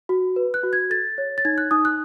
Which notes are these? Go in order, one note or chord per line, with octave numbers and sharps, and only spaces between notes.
F#4
B4
F#6
F#4
G#6
A4 A6
C#5
A6
D#4 G#6
F#6
D#4 D#6
F#6